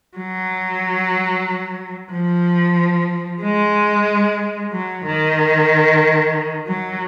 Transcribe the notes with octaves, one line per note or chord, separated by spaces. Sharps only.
F#3
F3
G#3
F#3
D#3
F#3